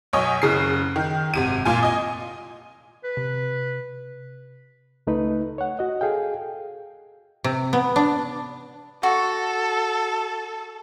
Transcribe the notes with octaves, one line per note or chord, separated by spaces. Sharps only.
B1 C#5 D#5 G#5
F#1 C#3 C7
D#3
G#1 C3 D#7
A#2 F4 G#5
D#5 G#5
B4
C3
C#2 A3 D#4 B4
C#5 F#5
F#4 D#5
G#4 A4 F5 G5
C3
B3
D4
F#4 A4